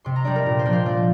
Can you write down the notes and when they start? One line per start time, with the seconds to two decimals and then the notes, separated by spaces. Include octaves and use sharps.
0.05 C3 C6
0.16 A#5
0.25 G3 D4 D5
0.36 A#4
0.46 A#2
0.59 C5
0.66 F3 A#3 D4
0.73 C5
0.86 A#2 D5